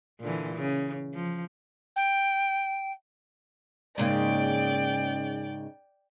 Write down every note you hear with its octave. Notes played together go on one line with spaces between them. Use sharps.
A#2 D3 E3
C#3
F3
G5
G#2 C#3 A#3 D5 G5